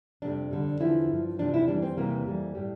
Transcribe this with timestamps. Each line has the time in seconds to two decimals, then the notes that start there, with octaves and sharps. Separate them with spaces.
0.22 F2 C3 G3 D4
0.51 F2 D3 G3
0.80 E2 D3 F3 E4
1.09 G2 F3
1.39 E2 C3 F3 D4
1.54 E4
1.68 F2 E3 G3 D4
1.82 C4
1.97 E2 C3 E3 G3 A#3
2.26 F2 E3 G3
2.55 A2 G3